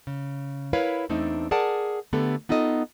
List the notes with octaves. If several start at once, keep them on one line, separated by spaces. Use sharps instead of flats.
C#3
E4 A#4 B4 C#5 F5
E2 A3 C4 D4 D#4
G#4 A#4 D5 F#5 A5
D3 A3 B3 G4 A4
B3 D#4 F4 A4 D#5